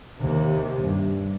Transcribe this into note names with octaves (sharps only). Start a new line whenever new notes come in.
D#2 C3
G2